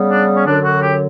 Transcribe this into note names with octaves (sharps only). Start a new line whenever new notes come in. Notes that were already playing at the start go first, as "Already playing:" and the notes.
Already playing: C#3 G3 B3
D4
C#4
F#2 D3 F#3 D4
F#4
G4